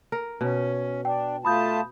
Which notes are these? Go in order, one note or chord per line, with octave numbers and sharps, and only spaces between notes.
A#4
B2 C#4
D4 G5
A3 F4 A5 B5 D#6 G6